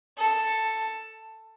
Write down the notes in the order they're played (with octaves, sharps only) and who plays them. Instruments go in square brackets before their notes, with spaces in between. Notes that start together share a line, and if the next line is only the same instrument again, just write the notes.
[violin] A4